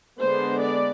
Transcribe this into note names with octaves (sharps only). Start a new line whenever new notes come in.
D3 G#3 B3 C5
D5